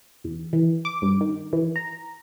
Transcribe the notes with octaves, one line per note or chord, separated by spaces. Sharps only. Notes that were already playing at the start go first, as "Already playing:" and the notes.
E2
E3
D6
G2
D#3
E3
A#5